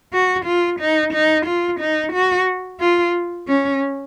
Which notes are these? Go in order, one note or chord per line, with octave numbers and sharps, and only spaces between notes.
F#4
F4
D#4
D#4
F4
D#4
F#4
F4
C#4